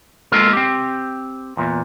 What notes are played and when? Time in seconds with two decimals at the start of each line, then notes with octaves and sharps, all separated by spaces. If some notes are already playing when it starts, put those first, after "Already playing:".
0.32 G#3 A#3 B3 F4 A4 A#4
0.53 C4 G4
1.57 E2 A#2